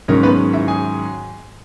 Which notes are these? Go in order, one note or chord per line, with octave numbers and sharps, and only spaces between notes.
G#2 D#3 F#3 C#4 A#4
B3 B4
E4 E5
G#4 G#5